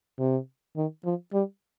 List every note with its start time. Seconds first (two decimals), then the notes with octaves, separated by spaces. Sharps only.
0.19 C3
0.76 D#3
1.05 F3
1.33 G3